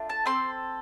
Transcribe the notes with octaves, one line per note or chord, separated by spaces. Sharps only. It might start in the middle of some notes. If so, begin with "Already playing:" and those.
Already playing: A3 D4 F4
A5
C4 A4 C6